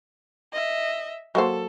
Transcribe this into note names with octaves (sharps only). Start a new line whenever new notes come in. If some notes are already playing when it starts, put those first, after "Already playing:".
D#5 E5
F#3 A#3 A4 C5